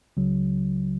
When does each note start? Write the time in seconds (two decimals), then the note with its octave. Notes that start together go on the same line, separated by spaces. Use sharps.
0.17 C#2 C#3 F#3